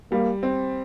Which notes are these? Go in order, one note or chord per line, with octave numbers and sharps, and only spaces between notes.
G3 A#3
C4